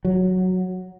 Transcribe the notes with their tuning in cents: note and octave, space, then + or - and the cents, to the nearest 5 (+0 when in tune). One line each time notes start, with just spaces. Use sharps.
F#3 +0